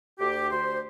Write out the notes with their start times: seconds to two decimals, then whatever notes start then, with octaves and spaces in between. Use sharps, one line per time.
0.19 D2 G4
0.51 D2 C5